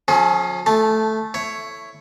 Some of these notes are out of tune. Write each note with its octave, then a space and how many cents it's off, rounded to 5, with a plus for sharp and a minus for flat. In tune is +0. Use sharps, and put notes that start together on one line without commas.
F3 +40 C#4 +0 G#4 +45
A3 -5 A5 -15
E4 +10 C#5 +0